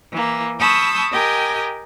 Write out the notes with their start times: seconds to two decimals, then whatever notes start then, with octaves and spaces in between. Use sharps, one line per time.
0.11 E3 A#3
0.60 A5 B5 C#6 D#6 E6 G6
1.12 G4 A#4 D#5 G5 G#5